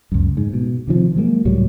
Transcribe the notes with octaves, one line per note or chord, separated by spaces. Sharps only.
C#2 F#2
G#2
B2
C3 D#3 F3
F#3 G#3 A#3
C#2 A2 F#3 G3